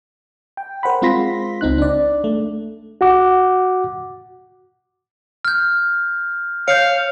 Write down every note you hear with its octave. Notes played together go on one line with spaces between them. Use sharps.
G5
A#4 C5 F#5 B5
G#3 C4 F4 C6 A#6 B6
C#2 C4 D#4 F#6
D4 D5
A3
F#4 F#5 D6
F6 G6
C#5 F5 G6 C#7